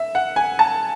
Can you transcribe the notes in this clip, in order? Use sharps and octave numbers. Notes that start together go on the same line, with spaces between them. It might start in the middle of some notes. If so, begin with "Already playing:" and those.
Already playing: E5
F#5
G#5
A5